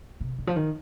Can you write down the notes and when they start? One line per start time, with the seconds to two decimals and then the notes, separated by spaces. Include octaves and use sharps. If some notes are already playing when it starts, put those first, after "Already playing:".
0.21 C3
0.38 D3
0.47 F3
0.56 D#3